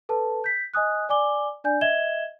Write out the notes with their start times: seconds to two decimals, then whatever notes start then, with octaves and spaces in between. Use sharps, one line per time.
0.09 A4 B4 A5
0.44 G6 B6
0.74 D#5 G#5 D#6 F#6
1.09 D5 G#5 D6 G7
1.64 D4 D5 G#5 G6
1.81 D#5 E5 G#6 E7 G7